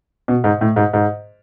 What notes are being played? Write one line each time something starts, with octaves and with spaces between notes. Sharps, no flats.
B2
G#2
A2
G#2
G#2